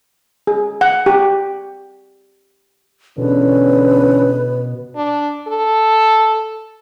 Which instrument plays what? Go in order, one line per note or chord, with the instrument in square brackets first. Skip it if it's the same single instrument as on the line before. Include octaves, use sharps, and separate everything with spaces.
[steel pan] G#4
F#5
G4
[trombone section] E2 D3 C#4 [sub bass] B2 [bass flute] B4
[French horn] D4
A4